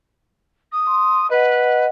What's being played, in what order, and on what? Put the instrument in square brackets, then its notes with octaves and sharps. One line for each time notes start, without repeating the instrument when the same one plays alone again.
[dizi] D#6
[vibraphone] C6
[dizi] B4 [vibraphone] D#5 F#5